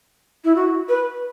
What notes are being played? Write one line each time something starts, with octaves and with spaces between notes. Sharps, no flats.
E4
F#4
B4